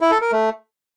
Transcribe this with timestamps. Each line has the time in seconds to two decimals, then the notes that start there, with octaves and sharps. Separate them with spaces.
0.01 E4
0.11 A4
0.22 A#4
0.32 A3